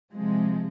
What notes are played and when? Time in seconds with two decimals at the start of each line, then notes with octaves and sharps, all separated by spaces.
0.12 C3 F3 G#3